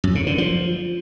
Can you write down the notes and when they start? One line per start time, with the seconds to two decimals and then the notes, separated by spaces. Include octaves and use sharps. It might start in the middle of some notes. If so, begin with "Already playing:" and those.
0.04 F#2
0.15 C#3
0.27 D3
0.38 F3